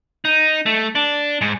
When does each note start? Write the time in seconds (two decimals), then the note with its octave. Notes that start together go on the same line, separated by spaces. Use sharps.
0.25 D#4
0.66 A3
0.95 D4
1.41 G#2